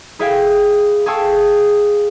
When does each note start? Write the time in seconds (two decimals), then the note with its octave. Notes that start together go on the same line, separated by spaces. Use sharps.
0.19 E4 G#4 E5 F5 G5
1.06 G#4 F5 G5 A5 C#6 E6